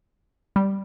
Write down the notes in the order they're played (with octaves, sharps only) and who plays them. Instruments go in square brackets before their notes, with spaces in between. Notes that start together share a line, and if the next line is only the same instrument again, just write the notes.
[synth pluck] G3